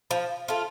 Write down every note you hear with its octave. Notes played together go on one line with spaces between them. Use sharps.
F3
A3 F4